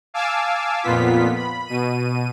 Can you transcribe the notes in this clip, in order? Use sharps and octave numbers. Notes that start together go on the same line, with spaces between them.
F5 G#5 A5 D6 E6
F2 A#2 B3 F4 B6
B5
B2 D#7